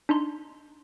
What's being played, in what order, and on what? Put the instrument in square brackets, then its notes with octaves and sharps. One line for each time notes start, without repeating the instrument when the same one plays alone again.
[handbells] D4 D#4 A#5 C6